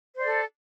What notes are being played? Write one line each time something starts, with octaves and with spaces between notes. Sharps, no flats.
A4 C5 D5